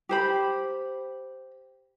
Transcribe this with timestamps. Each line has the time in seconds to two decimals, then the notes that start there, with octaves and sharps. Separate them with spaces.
0.09 G4 C5 B5